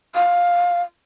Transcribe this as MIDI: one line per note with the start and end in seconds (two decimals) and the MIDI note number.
0.15 0.82 77